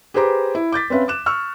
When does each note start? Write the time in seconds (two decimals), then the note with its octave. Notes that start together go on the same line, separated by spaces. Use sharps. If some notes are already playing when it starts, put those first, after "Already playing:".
0.14 G4 G#4 B4 C5 A#5 D6
0.55 E4
0.72 D6 G6 A6 B6
0.90 C4 C#4 B4 E5 F5
1.08 D6 F#6 E7
1.26 C#6 E6 F6